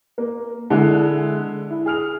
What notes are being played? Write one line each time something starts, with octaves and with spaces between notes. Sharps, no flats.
A#3
D3 G#3 E4
E4
G#4 F6 F7